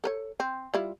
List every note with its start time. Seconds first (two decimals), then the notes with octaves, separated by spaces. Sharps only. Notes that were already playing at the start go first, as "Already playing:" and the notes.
0.04 A4 A#4 C#5
0.40 C4
0.74 G3 E4 F4